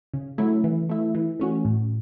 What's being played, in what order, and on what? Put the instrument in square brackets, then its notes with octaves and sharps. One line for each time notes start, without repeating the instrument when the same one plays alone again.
[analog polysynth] C#3
F#3 A3 E4
E3
A3 E4
E3
A3 C#4 F#4
A2